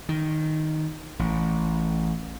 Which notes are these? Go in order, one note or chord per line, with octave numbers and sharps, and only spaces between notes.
D#3
A1